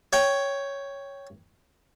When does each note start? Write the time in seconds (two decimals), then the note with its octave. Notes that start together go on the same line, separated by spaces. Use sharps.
0.13 C#5 G5